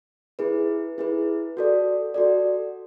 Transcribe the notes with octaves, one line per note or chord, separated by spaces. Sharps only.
E4 G#4 B4
E4 G#4 B4
F#4 A4 D5
F#4 A4 D5